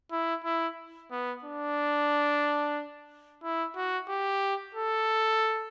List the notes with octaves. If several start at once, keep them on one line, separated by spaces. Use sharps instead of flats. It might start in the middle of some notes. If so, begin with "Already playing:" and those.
E4
E4
B3
D4
E4
F#4
G4
A4